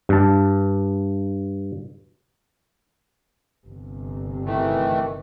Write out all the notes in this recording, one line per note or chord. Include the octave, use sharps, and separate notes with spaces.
G2 A5
G1 C3
D#3 E3 A3